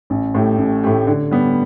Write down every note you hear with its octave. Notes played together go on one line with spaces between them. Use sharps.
A1
A2 A3 G4
A1
A2 A3 G4
D3
G3 B3